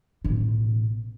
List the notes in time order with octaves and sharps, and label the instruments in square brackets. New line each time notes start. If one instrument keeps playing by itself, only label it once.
[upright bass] A1 B2